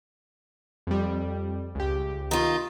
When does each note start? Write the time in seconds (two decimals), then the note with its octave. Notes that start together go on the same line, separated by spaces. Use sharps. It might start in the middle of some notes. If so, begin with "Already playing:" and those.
0.87 F2 G3
1.75 C#2 G4
2.31 D#3 F4